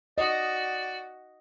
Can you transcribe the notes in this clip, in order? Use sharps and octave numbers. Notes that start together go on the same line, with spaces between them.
F#4 D5 D#5